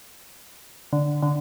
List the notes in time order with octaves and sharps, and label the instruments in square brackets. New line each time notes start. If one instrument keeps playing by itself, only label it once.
[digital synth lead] D3
D3